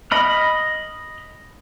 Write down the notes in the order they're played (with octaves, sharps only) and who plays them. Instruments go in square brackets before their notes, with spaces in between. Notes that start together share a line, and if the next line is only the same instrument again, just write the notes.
[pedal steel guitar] D#5 B5 F6